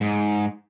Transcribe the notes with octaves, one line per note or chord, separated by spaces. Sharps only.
G#2